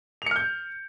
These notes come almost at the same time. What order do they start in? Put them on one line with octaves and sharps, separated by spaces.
F7 C#7 F6 G6